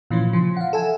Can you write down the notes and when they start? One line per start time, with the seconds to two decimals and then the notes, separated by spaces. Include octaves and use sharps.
0.11 A#2 E3 F3 C#4
0.33 C#3 F3
0.57 F5 F#5
0.73 A4 E5 G#5 A5